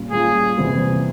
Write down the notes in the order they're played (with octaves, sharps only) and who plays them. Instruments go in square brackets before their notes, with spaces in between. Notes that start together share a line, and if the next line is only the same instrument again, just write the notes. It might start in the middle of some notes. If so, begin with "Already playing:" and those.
Already playing: [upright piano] A#2 G3 C#4 F4
[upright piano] A#2 G3 C#4 F4 [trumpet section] G#4
[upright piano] E2 C3 G3 A#3